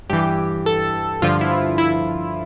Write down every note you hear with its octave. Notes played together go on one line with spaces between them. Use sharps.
G2 E3 G4
A4
G2 D3 F3 F4
E4
E4